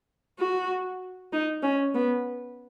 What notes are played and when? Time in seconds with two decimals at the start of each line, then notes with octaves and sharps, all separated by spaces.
0.39 F#4
1.32 D#4
1.63 C#4
1.94 B3